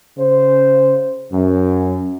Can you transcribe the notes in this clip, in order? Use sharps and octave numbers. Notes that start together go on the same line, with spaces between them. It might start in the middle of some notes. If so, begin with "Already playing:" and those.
C#3 C5
F#2